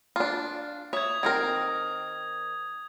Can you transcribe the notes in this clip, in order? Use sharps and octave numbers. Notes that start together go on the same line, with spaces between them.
D4 F4
C#5 E5 D#6 G#6
D#3 C4 A#4 G#6